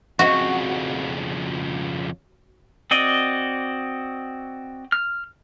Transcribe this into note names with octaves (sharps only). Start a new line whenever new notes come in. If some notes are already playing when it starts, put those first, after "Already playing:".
F2 C#3 F#4
C4 F#4 D5 D#5
F6